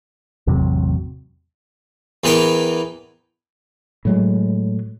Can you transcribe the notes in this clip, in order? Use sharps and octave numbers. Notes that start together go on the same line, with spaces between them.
A1 E2 C3 F#3
E2 E3 B3 A#4 G5
A2 F#3 G#3